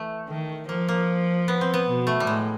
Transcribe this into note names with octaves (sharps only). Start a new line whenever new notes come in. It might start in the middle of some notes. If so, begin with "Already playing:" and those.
Already playing: E3 A3
D#3
F3 A#3
A#3
B3
C4
B3
B2
A3
G3
A2 G#3